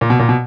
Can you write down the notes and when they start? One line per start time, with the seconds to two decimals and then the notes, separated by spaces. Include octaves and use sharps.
0.01 A#2
0.10 B2
0.19 A#2
0.29 B2